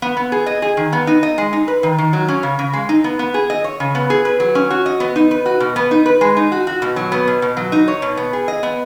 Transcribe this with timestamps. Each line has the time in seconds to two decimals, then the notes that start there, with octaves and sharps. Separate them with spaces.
0.02 B3
0.17 B3
0.32 G#4
0.46 D#5
0.62 G#4
0.77 D#3
0.93 B3
1.07 D#4
1.23 D#5
1.38 G#3
1.53 D#4
1.68 B4
1.83 D#3
1.98 D#3
2.13 F#3
2.28 C#4
2.43 C#3
2.59 C#3
2.73 G#3
2.89 D#4
3.04 B3
3.19 B3
3.34 G#4
3.50 D#5
3.64 C#5
3.80 C#3
3.95 B3
4.10 G#4
4.25 B4
4.40 F#3
4.55 C#4
4.70 F#4
4.86 D#5
5.00 B3
5.16 D#4
5.31 B4
5.46 F#4
5.60 B2
5.76 B3
5.91 D#4
6.06 B4
6.21 G#3
6.37 D#4
6.52 F#4
6.67 F#4
6.82 B2
6.96 F#3
7.12 B3
7.27 B2
7.42 B2
7.57 F#3
7.72 D#4
7.88 C#5
8.02 B2
8.17 B3
8.33 G#4
8.48 D#5
8.63 B3